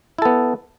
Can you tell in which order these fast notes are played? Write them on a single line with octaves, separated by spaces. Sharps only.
E4 A4 B3